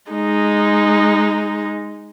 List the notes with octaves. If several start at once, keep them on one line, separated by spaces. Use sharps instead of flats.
G#3 D#4